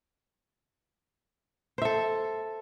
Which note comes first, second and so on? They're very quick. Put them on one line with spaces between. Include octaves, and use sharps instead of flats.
C5 E5 A4